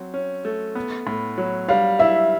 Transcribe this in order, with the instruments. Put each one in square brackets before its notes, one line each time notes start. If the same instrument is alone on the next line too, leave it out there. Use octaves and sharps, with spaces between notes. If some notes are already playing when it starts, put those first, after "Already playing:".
Already playing: [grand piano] F#3 C4
C#4
A3
B3
A2
F#3
[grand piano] G3 [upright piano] F5
[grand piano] E4 [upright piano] E5